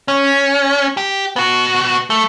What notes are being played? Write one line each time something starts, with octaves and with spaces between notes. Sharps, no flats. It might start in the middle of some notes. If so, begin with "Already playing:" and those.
C#4
G4
B3 F#4
A3